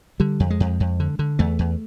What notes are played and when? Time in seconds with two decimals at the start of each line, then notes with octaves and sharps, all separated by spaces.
0.20 D3 G3
0.40 F2
0.50 G#3
0.60 F2
0.80 F2
1.00 D3
1.19 D3
1.39 E2 A3
1.59 E2